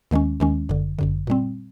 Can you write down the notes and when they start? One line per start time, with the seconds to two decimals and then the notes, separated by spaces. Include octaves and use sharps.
0.11 D#2 D#3 G#3 C#4
0.40 D#2 D#3 G#3 C#4
0.69 G1 F#2 D3
0.99 G1 F#2 D3
1.27 A#2 G3 C4